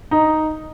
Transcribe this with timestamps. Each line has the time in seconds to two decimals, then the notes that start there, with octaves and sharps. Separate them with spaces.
0.11 D#4